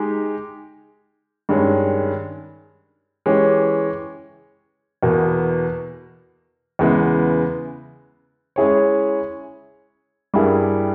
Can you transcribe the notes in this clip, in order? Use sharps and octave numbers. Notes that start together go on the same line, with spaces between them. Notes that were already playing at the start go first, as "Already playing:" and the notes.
Already playing: G#3 D#4 G4
G2 D#3 G#3 C#4
E3 G#3 C#4 G4 C#5
E2 B2 A#3
E2 C#3 G#3 B3 E4
G#3 C#4 E4 G#4 C#5
G2 G3 A#3 E4 G#4